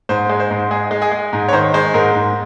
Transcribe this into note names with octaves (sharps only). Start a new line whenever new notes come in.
G#2 C5
G#3
C5
G#2
G#3 G#4
G#3
G#4
G#3
G#2
C#5
D#3 C5
G#3 C5
G#2 A#4
G#2